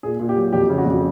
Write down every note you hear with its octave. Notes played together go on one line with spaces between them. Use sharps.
A#2 G#4
A#2
G4
F#3
F2 G4
C#3
F#4
F2